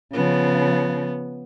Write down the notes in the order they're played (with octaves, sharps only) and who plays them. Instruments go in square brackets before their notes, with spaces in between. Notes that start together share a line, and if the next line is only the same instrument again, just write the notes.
[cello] C#3 F3 [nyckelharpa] B3